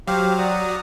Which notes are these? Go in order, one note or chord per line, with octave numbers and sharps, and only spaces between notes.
F#3 G4 C5 F5
D5 F#5 A#5 D#6